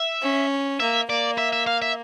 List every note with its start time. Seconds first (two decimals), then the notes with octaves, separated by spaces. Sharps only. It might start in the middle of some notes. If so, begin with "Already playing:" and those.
Already playing: E5
0.22 C#4
0.80 A#3 E5
1.09 A#3 D5
1.38 E5
1.52 E5
1.67 F5
1.82 E5